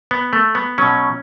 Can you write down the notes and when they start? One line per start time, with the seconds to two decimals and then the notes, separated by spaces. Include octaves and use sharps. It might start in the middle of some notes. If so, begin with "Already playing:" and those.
0.11 B3
0.33 A3
0.55 B3
0.78 B2 F#3 C#4